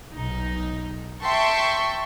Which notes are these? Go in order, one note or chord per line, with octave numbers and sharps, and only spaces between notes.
B1 D#4
E5 G5 A5 C6 C#6